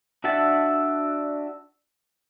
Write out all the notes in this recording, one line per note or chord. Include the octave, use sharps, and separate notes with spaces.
D4 F#4 E5 F#5 A5